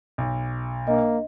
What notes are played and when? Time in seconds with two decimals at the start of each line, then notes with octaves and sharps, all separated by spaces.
0.18 B1
0.88 A#3 D4 D#5